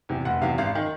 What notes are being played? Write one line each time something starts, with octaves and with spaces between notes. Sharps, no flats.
E2 C3
F1 F#5
E2 C3 F5
G#1 F5
D#3